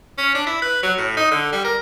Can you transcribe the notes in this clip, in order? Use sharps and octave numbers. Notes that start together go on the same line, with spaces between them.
C#4
D4
E4
B4
F#3
A2
D#4
D3
G3
A#4